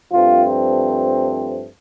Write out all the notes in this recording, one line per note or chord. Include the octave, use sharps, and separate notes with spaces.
G2 F3 A3 C4 F4